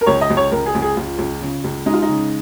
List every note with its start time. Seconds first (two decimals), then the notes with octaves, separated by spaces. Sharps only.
0.01 A#4
0.06 C#2 C#5
0.21 D#5
0.30 C#2
0.37 C#5
0.52 C#2 A#4
0.66 G#4
0.75 C#2
0.82 G#4
0.97 C#2 F4
1.18 C#2
1.41 C#3
1.64 C#2
1.86 G#3 D#4
1.93 F4
2.02 D#4
2.09 C#3